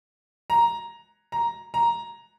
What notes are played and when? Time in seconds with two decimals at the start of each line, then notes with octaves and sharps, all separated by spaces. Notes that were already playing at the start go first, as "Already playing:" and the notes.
0.50 A#5
1.32 A#5
1.74 A#5